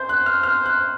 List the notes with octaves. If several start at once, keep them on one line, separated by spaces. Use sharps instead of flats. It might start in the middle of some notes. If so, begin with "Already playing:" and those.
Already playing: C5 G6
F#6
F6
F6
F#6